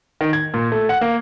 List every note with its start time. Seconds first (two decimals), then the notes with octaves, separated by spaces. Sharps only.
0.21 D#3
0.33 G#6
0.54 A#2
0.72 A3
0.89 F#5
1.01 A#3